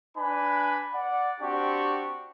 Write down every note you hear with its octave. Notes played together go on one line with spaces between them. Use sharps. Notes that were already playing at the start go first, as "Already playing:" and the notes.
D4 B4 G#5 B5
D5 F#5
C4 D4 F#4 G4 D5 C#6